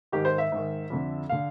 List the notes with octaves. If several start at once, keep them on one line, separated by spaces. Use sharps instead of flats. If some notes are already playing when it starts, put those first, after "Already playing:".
G#2 D#3 G4
C5
E5
G#2 D#3
F2 D3
D3 F5